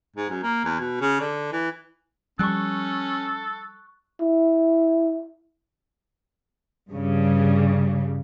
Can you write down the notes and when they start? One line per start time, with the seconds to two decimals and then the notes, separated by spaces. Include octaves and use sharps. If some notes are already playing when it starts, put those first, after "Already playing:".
0.16 G#2
0.30 F#2
0.43 A#3
0.64 E2
0.80 B2
1.00 C#3
1.20 D3
1.52 E3
2.39 F3 G3 C#4 A4 C#6 F#6
4.21 E4
6.91 G2 C#3 G3